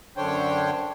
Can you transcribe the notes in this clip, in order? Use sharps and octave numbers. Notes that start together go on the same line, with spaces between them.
F#2 D3 D4 C5 C#5 G5